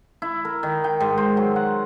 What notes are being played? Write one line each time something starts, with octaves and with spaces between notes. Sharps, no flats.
E4
A#4
D#3
G5
G#2
C5
F#3
F#5